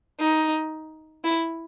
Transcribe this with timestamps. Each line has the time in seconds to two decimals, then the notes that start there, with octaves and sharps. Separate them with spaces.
0.20 D#4
1.24 E4